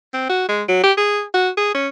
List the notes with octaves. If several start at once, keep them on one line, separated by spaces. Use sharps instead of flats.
C4
F#4
G#3
F#3
G4
G#4
F#4
G#4
C#4